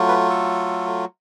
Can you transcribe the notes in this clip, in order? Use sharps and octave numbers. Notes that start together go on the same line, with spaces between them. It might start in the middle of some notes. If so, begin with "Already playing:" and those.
Already playing: F#3 A3 F4
B4
A4